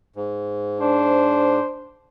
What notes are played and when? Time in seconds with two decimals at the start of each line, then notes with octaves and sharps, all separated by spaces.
0.16 G#2
0.81 D4 C5